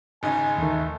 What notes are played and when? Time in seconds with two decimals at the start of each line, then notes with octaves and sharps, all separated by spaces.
0.23 G#1 C#3 D#4 G#5
0.58 D#2 D#3 A3